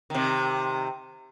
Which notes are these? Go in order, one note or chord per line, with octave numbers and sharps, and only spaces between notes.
C3 D#3